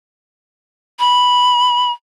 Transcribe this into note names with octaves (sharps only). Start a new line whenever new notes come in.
B5